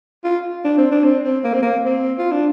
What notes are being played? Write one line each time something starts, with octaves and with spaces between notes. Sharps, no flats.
F4
D4
C4
D4
C4
C4
A#3
C4
A#3
C4
F4
D4